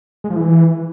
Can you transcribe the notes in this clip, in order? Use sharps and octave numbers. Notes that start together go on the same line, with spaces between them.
G#3
F3
E3